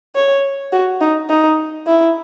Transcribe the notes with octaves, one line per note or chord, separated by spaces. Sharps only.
C#5
F#4
D#4
D#4
E4